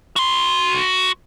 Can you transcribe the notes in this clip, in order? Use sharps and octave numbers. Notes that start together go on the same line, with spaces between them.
F#4 C6